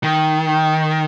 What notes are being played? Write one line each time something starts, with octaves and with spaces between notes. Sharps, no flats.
D#3